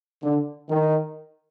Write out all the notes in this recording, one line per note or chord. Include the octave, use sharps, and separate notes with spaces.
D3
D#3